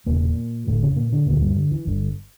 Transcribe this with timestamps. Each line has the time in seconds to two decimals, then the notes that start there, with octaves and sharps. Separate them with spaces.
0.06 E1 E2 A#2 C#3 A#3
0.67 F1 F2 A2 D3 A3
0.82 C#3 C#4
0.96 A#2 A#3
1.12 D3 D4
1.26 E1 D2 A#2 D3 A#3
1.41 G2 G3
1.56 D3
1.72 E3
1.87 G1 G2 D3